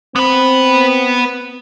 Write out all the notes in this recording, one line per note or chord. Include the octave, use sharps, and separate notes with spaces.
B3 C4 B4